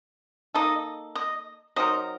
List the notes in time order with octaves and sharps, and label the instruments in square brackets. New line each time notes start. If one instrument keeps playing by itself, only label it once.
[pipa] A#3 D#4 A4 [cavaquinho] D#5
[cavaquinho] D#5
[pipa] F#3 C4 D#4 A#4 [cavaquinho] D#5